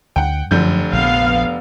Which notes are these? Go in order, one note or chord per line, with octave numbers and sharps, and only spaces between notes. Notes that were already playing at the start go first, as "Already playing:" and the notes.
D2 F#5 G5
F1 F#2 D3 F3 F#3 G6
A#1 B3 F5